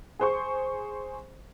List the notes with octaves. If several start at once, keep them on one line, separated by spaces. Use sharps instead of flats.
G#4 C5 C#6